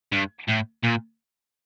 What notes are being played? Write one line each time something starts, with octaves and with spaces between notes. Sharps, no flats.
G2
A2
A#2